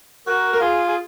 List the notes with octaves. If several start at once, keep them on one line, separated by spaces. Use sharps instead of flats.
F#4 A#4
A#4
F4 G#4
G#4